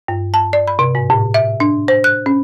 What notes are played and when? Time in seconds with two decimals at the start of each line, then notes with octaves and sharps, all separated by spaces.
0.08 G2
0.34 A5
0.53 D5
0.68 B5
0.79 C3
0.95 G#2
1.10 A2
1.34 E5
1.60 D4
1.88 C5
2.04 F#6
2.26 C#4